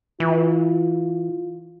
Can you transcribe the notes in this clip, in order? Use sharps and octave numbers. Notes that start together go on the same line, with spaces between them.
E3 F4